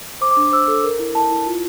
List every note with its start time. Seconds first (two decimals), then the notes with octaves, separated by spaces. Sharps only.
0.21 C5 D6
0.31 D6
0.37 D4
0.52 C5 E6
0.68 A4
0.84 A#4
0.99 E4
1.15 E4 A5
1.30 E4
1.46 F4